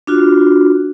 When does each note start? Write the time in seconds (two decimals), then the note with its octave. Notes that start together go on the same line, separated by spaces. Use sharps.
0.07 D4 F4 F#4